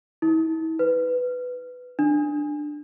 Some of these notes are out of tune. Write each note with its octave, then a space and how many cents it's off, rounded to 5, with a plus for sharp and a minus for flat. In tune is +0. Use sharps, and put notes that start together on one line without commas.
E4 -45
B4 +10
D4 +15